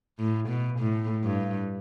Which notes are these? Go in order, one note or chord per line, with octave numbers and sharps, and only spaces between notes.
A2
B2
A2
G2